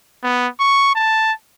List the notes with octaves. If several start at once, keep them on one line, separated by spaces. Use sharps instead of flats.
B3
C#6
A5